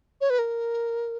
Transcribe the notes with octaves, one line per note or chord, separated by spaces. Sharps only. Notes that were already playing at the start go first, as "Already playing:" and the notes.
C#5
B4
A#4